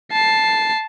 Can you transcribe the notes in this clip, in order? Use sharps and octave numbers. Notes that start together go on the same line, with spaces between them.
A5 C7